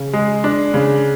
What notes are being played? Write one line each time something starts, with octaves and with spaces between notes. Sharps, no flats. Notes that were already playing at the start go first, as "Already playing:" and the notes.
Already playing: C#3
G#3
D4
C#3